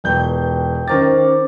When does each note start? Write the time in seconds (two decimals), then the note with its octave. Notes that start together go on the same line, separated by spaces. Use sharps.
0.04 E1 B3 F4 G5 G6
0.88 D#3 C#4 A#4 C5 D6 A6